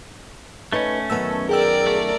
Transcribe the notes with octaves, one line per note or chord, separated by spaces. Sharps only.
A3 C#4 D#4 B4 C#5
F#2 D#3 B3 A5 E6
G#4 A#4 D5 G5 E6
A3